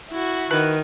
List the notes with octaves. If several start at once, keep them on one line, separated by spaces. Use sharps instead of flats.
E4 F#4
D#3 B4